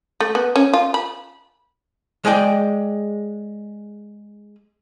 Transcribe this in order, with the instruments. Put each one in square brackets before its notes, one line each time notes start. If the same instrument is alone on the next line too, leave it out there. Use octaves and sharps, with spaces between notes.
[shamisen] A3
B3
C#4
F4
B5
[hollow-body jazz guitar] G#3 G#4 D5 G5